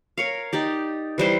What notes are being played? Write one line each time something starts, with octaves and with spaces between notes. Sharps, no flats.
A#4 C#5 F5
D#4 G4 D5
E3 G3 C5 C6